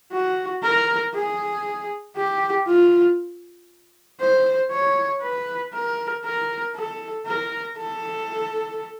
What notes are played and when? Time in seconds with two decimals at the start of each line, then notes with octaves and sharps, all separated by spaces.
0.12 F#4
0.63 A#4
1.14 G#4
2.16 G4
2.67 F4
4.20 C5
4.71 C#5
5.22 B4
5.73 A#4
6.25 A#4
6.75 A4
7.26 A#4
7.78 A4